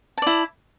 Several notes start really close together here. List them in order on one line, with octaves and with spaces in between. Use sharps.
A5 D5 E4